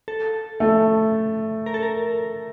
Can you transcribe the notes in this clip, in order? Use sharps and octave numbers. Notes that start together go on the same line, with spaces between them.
A4
A3
A#4
A4
A#4